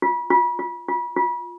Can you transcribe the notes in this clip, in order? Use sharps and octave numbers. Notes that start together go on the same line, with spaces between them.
F4
F4
F4
F4
F4